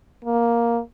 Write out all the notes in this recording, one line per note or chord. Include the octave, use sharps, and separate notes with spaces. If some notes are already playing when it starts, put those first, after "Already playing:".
A#3